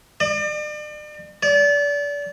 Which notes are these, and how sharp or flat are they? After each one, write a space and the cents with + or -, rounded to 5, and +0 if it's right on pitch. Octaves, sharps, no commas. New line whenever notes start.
D5 +40
D5 -30